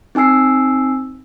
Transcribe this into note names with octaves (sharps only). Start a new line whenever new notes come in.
C4 D#4 G#5 E6 C7